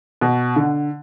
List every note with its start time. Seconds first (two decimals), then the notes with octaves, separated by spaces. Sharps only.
0.21 B2
0.56 D3